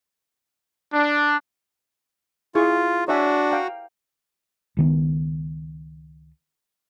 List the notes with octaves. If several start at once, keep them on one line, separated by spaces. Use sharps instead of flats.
D4
E4 F4 G#4 C#6
D4 F#4 C#5 E5 G#5
F5 G5 A#5
C#2 D#3 B3